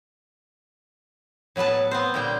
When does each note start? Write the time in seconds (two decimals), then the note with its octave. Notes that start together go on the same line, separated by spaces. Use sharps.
1.56 A2 F#3 B3 B4 A5
1.91 B3 C4 C5
2.14 A#2 D3 G3 G5